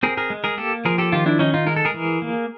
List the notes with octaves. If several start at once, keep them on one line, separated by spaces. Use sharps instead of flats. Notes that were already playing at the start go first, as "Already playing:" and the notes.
C4 G#4 A#4
G#4 A#4
G#3
G#4 A#4
A#3 G4 A4
F3 G#4 A#4
G4 A4
D#3 F4 G4
D4 E4
D#3 C#4 D#4
D#4 F4
G#3 A#4
A4
G#4 A#4
E3
A#3